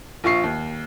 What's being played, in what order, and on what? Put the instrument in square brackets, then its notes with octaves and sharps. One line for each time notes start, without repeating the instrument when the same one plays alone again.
[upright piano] A#1 F4 C#6 C7
D#2